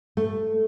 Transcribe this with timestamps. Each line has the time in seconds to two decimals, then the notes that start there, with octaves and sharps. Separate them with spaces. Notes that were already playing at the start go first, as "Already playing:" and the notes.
0.17 A3